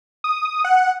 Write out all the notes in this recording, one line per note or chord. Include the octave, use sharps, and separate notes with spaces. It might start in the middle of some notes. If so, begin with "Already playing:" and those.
D#6
F#5